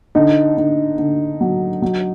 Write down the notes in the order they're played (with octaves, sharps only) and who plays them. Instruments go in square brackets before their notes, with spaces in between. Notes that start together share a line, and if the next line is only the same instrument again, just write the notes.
[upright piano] D3 [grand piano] D#4
[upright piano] D3
D3
F#3
F#3